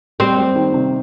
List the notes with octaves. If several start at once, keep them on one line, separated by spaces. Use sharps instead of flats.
G3 C4
G3
D#3
C3